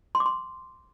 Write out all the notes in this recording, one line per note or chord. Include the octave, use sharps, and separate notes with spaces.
C6
D6
C6